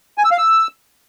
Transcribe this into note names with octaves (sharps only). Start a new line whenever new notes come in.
G#5
E6
F5
E6